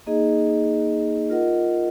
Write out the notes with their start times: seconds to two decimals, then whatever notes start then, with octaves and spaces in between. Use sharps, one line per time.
0.06 A#3 D#4 G#4 D#5
1.30 F4 A#4 D#5 F#5